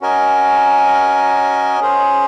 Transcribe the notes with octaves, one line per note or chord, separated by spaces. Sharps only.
C#4 F#4 A#4 D#5 G#5
C#4 G#4 C5